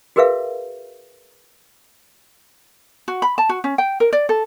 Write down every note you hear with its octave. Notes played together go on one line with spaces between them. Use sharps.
F#4 G#4 A#4 B4 E5 F5
F#4
B5
A5
F#4
C#4
G5
A#4
D5
A4